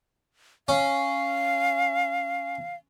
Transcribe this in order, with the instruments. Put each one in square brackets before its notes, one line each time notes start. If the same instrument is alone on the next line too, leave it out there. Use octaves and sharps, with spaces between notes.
[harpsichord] C#4 [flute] F5